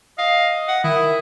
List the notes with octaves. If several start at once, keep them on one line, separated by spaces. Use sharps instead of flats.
D#5 F5
F#5
D#3 E4 D#6